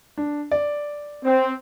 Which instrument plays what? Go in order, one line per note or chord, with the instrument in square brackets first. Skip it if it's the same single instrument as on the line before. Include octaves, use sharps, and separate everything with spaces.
[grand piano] D4
D5
[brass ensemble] C4